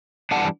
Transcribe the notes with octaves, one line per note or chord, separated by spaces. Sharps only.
E3 G3 D4 F#5 A5